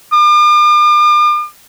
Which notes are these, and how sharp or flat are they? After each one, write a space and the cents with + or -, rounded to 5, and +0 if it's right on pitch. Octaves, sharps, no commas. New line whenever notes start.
D6 +45